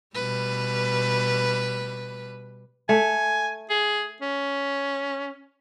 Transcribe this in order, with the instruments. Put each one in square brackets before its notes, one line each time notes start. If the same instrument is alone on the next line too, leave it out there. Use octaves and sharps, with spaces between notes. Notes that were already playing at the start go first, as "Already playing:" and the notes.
[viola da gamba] B2 G3 B4
[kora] A3 [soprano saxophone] G#5
[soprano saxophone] G#4
C#4